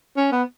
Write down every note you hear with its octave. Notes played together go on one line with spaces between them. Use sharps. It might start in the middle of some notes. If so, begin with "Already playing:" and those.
C#4
B3